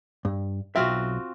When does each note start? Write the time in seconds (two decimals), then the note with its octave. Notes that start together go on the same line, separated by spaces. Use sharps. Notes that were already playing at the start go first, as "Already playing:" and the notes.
0.25 G2
0.76 B1 E2 C4 F4 F#4 E5